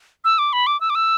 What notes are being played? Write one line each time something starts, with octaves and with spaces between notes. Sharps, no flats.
E6
D6
B5
D6
E6
D6
E6